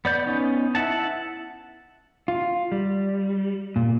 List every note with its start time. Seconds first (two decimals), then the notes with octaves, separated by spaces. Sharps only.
0.05 B3 D5 G6
0.26 B3 C#4 D#4
0.75 E4 E5 F#5 A5
2.28 F4
2.72 G3
3.76 A#2